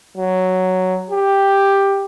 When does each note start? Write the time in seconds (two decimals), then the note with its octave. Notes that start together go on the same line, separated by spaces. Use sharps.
0.17 F#3
1.10 G4